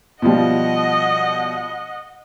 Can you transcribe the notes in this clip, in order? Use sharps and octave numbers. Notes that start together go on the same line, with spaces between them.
B2 F3 G3 D#5 F#5